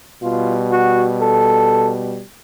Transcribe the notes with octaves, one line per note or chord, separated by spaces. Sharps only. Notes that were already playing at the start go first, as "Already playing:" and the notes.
B2 G3 F4
F#4
A4